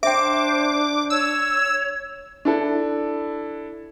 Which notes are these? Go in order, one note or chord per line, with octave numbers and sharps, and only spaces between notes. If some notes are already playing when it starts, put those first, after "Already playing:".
D4 C5 E5 G5 D6
C#5 E6
D4 E4 A4